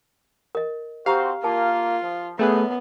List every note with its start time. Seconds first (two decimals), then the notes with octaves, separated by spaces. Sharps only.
0.55 A#4 D#5
1.06 C4 F#4 G4 C5 F5 A#5
1.44 A#3 F4 A#4 A5
2.03 F3
2.39 F#2 A3 B3 G#4 B4